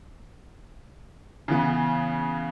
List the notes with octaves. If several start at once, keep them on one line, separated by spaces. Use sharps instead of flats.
C#3 E3 B3